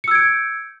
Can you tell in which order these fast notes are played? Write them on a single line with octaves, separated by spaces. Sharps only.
C#7 E6 G#6 D7 G6